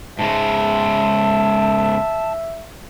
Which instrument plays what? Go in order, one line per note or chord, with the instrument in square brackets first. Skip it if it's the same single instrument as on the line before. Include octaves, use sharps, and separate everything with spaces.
[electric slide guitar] G#2 C#3 G#3 [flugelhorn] E5 [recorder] A5